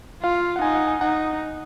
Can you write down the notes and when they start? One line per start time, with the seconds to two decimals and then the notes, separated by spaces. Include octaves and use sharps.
0.23 F4 F5
0.56 F#5
0.62 D#4 G#5
0.75 F#5
0.87 G#5
1.01 D#4 F#5